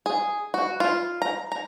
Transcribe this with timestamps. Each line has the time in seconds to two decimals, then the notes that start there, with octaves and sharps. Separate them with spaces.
0.06 G#4
0.54 F#4
0.80 F4
1.22 A#5
1.52 A#5